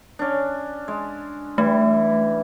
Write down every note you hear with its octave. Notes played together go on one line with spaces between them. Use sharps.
C#4 D4
G#3
E3 G3 A3